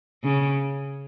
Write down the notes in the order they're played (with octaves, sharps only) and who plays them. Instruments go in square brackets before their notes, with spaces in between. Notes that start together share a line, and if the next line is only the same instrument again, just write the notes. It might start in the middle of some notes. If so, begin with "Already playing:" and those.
[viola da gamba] C#3